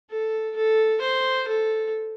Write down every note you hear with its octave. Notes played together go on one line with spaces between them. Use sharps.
A4
A4
C5
A4